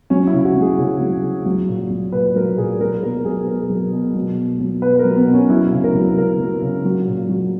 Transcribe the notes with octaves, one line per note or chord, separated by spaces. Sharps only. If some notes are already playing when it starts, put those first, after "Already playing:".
F#3 C#4
E4
C#3
F#4
F#3
G#4
C#3
F#3
C#3
F#3
A#2
F#3
A#2 B4
F#3 A#4
A#2 G#4
F#3 A#4
B2 A#4
F#3 G#4
G#4
B2 A#4
F#3
B2
F#3
B2
F#3
B2 B4
A#4
F#3
B3
B2
C#4
F#3 E4
C#3
A#4
F#3
C#3 A#4
F#3
C#3
F#3
A#2
F#3